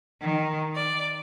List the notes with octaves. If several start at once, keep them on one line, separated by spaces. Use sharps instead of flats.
D#3
D5